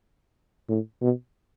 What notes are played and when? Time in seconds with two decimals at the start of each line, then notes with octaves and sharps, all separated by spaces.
0.69 A2
1.02 B2